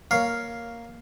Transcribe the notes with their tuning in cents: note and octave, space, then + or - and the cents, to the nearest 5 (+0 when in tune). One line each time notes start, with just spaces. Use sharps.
A#3 +0 C#5 +10 F5 +0